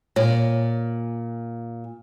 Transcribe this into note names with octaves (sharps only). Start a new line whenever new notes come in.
A#2 C#5